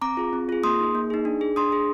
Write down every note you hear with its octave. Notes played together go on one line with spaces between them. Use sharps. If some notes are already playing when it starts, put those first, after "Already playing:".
C4 A#5 D6
F4 G#4
C4
F4 G#4
A#3 C6 D#6
D#4 G#4
A#3
D#4 G#4
D4
G#4
D4 C6 D#6
G#4